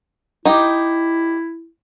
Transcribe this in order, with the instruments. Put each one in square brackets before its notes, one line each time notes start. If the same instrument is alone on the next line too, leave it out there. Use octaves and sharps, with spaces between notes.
[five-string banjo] D#4 G4 [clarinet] E4